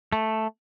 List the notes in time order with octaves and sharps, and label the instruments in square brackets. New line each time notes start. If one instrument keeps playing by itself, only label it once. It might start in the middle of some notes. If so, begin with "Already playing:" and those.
[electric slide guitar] A3